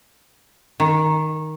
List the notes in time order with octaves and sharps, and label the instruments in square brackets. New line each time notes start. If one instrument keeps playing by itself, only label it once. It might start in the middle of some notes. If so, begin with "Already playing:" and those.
[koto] D#3